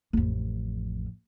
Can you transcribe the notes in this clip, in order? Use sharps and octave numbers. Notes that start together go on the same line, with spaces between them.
A1 F2